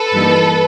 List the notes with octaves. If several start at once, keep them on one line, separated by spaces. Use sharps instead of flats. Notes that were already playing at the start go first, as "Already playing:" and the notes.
Already playing: A4 B4
G2 E3 G3 A#3 D#4